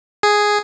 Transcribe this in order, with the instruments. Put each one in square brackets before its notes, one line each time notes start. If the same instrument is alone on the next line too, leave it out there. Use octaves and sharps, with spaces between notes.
[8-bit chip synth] G#4